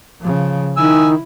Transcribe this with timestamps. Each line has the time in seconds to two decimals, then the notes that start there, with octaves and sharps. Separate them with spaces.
0.21 C#3 F3
0.77 D#3 E4 G#5 E6